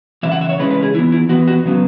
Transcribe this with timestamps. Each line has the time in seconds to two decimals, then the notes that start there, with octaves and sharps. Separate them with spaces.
0.23 C#3 E3 E5
0.32 F#5
0.41 E5
0.49 C#5
0.59 C#3 E3 G#3 C#4 B4
0.71 B4
0.82 G#4
0.94 E3 E4
0.99 B3
1.12 E4
1.29 E3 B3 F#4
1.48 F#4
1.64 C#3 F#3 B3